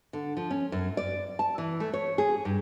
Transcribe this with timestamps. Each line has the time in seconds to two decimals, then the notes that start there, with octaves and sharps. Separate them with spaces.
0.13 D3
0.37 F3
0.51 C#4
0.72 F#2
0.97 D5
1.39 A5
1.58 E3
1.80 A3
1.94 C#5
2.18 G#4
2.45 G2